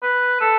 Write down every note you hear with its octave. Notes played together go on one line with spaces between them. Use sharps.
B4
A4